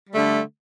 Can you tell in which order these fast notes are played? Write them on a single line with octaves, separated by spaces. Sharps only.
G3 A3 D3